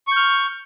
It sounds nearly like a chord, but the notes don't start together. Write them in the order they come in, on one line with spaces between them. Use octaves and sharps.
C#6 G6 F6